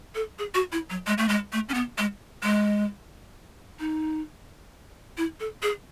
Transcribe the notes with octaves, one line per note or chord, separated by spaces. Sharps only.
A4
G#4
F#4
E4
F#3
G#3
A3
G#3
A3
C#4
B3
G#3
G#3
D#4
E4
A4
G#4